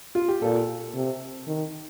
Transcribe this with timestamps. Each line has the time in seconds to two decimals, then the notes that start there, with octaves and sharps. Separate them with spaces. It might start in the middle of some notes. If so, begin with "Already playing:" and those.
0.15 F4
0.28 G4
0.42 A#2 A4
0.94 C3
1.47 D#3